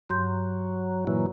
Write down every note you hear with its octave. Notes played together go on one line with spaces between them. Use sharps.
G2 F#3 C6 G6
A#2 E3 F#3